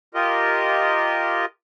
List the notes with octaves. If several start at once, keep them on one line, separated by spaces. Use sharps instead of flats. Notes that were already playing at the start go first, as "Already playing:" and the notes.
F4 G4 A#4 D#5